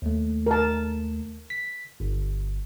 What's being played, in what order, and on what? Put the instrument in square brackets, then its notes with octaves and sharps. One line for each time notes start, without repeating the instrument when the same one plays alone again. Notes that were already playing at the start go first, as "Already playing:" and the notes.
[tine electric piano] D#2 A3
[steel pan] A#4 A5
[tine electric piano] B6
G1